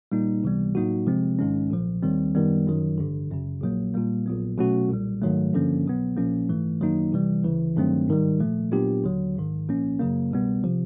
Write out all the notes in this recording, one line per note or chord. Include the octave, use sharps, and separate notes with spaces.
A#2 G3 A#3 D#4
C#2 C3 E3 G3 B3
A2 F#3 A#3 D#4 F#4
C3 F3 G#3 C4
A#1 G#2 D#3 G#3 C#4
B1 A#2 F3
D#2 D#3 G3 C4
F#2 D#3 G3 B3
G1 F#2 D#3 F#3
A1 G2 D3
G#1 F#2 C#3
A#1 A#2 F#3 A#3
A#2 G3 A#3
A#1 A#2 F#3 B3
B2 F#3 A3 C#4 F#4
B1 A#2 G3
G#2 D#3 F#3 A3
G2 D3 F3 A#3 C#4
C2 B2 F#3 B3
A#1 A#2 F3 A#3 C#4
G#2 E3 A3
F#2 D#3 F#3 A#3 D#4
C3 E3 G3
D2 C#3 E3
G2 D#3 F#3 A3 C4
G#2 D#3 G3
A#2 F3 A3
A#2 F#3 B3 D4 G4
D#2 D3 F#3
A#1 G#2 D#3
C2 A#2 F3 A#3 C#4
F#2 C#3 F#3 A#3
C2 B2 G3 B3
C3 F3